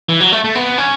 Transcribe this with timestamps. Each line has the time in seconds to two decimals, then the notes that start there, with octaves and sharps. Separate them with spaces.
0.09 E3
0.20 F#3
0.32 A3
0.44 A3
0.55 B3
0.78 C#4